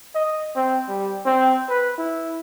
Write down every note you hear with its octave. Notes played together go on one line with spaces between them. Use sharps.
D#5
C4
G3
C4
B4
E4